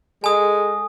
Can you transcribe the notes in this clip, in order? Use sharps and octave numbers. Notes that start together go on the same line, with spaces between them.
G#3 A4 G#5 D#6